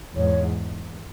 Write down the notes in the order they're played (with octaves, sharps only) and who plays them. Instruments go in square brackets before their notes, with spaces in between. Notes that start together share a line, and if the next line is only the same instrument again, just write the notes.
[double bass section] E2 G#2 [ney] C#5